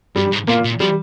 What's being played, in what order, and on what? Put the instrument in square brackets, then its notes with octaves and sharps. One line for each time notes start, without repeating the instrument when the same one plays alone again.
[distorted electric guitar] G2 [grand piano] G3
[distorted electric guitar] G#2
[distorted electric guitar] A#2 [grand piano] A#3 F4
[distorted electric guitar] A#2
[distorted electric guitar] F3 [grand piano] G3